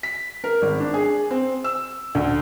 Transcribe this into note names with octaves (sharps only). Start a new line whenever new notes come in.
B6
A#4
G#1
D4
G#4
C4
E6
D2